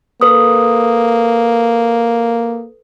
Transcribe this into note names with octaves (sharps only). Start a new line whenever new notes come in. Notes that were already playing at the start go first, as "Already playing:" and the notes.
A#3 A4 B4 D#6